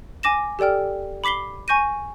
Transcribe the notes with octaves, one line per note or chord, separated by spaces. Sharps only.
G#5 D6 A#6 E7
G4 A4 D5 G5 F6
B5 D6 B6 C7 G7
G#5 C#6 G6 A#6 D#7